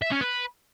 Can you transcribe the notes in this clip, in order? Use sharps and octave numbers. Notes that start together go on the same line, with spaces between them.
E5
C#4
B4